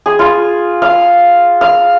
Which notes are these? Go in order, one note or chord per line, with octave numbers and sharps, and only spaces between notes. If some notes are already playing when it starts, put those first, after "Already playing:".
G#4
F4
F5
F5